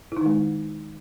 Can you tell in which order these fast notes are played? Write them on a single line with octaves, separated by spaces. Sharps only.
E4 D#4 D#3 G#3